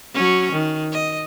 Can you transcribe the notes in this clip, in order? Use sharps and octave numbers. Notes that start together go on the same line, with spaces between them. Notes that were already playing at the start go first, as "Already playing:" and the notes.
F#3 C#4
D#3
D#5